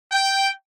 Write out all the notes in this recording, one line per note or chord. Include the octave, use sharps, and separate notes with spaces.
G5